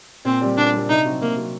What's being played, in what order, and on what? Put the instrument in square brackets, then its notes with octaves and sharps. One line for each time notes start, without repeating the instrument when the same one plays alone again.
[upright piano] A#2 [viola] C4
[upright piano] G3 C4 G4 D5
[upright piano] A#2 [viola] D4
[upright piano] G3 C4 G4 D5
[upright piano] C3 [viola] D#4
[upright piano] F#3 C4 F#4
[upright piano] C3 [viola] A#3
[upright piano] F#3 C4 F#4